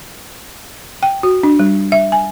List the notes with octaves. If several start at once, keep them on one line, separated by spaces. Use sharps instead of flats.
G5
F#4
D4
G3
E5
G#5